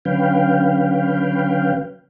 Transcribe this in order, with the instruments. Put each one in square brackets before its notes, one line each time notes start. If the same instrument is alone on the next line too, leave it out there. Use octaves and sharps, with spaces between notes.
[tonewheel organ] D3 F#3 C#4 B4 F5 G5